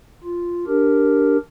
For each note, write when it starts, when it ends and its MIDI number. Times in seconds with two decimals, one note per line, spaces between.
0.24 0.65 65
0.67 1.37 62
0.67 1.37 67
0.67 1.37 70